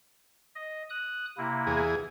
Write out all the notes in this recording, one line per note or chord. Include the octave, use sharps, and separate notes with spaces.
D#5
D#6 F#6
C3 A#3 E4
E2 G#4